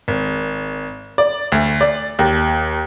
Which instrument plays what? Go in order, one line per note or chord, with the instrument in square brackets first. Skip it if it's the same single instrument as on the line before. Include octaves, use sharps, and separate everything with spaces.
[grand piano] G#1
D5
D2
D5
D#2